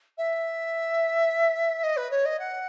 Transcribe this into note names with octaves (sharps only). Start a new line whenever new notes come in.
E5
D#5
B4
C#5
D#5
F#5